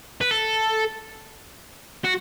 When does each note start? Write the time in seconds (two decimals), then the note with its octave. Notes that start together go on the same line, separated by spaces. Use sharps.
0.21 B4
0.31 A4
2.04 F#4